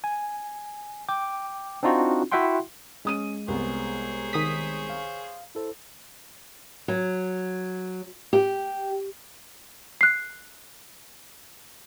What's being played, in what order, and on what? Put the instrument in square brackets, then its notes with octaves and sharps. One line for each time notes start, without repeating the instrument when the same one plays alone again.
[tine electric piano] G#5
G5 D6
C4 D4 D#4 F4 F#4
E4 F#4 E5 F#5 G5 C6
[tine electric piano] G#3 [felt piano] C#4 D#6 D#7
[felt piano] C2 B3 [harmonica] G#4 C5 C#5
[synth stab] D#3 D#6 B6
[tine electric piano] F5
E4 A4 C5
[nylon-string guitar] F#3
G4
[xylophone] F#6 C7